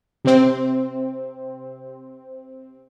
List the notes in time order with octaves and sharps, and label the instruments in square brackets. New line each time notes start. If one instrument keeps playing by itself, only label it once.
[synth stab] C3 C4